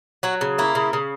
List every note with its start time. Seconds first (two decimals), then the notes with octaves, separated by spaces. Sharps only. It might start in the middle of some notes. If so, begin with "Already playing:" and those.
0.23 F#3 F#4
0.41 C#3
0.58 A#3 E4
0.75 C#3
0.93 C#3